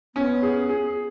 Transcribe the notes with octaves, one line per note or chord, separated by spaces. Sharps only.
B3 C#4
G#4
G#4